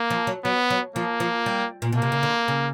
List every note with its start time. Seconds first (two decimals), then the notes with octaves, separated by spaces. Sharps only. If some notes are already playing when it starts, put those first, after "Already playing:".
Already playing: A#3
0.10 F3
0.27 F#3
0.44 F#3 B3
0.70 F#3
0.96 F3 A#3
1.20 F3
1.46 G3
1.82 A#2
1.92 B2
1.97 A#3
2.02 C3
2.12 C#3
2.23 D3
2.48 C#3